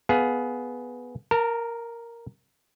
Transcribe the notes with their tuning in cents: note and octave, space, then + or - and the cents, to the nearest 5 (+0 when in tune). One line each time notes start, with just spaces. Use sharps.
B3 +0 G#4 +15 F5 +0
A#4 +0 A5 +45